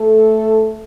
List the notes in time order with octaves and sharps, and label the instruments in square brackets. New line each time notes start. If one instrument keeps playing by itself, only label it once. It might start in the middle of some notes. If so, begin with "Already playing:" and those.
Already playing: [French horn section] A3 A4